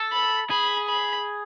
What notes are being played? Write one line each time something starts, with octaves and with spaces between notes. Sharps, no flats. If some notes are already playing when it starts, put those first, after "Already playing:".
Already playing: A4
B5
G#4 B5
B5